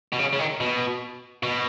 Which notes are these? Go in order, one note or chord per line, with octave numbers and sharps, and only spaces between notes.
B2
C#3
C#3
D#3
B2
B2